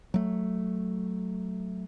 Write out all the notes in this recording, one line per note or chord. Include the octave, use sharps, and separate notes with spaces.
F#3 A3